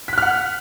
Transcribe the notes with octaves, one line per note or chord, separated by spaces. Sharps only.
F#5 F6 F#6 B6